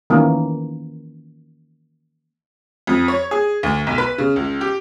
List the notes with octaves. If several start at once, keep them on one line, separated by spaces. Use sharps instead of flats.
D#3 E3 A#3 C#4
F2
C#5
G#4
D2
B1
B4
C#3
C#2
G4